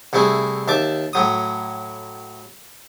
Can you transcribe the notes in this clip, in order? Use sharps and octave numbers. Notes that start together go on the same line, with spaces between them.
C2 C3 A3 E4 G#4
D#2 E5 A5 D6
A2 F#3 D#6